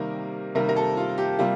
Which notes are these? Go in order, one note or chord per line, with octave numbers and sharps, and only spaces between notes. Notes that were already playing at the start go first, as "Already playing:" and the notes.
Already playing: C3 D#3 G3 A#3 A#4
C3 D#3 G3 A#3 A#4
A#4
A4
F4
G4
C3 G3 A#3 F4